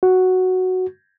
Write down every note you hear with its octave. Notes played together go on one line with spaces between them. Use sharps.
F#4